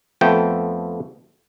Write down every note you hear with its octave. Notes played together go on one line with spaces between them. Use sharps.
F2 F3 A3 B3 G5